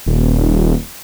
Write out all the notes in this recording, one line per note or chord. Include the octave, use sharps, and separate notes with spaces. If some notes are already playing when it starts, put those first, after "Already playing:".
D#1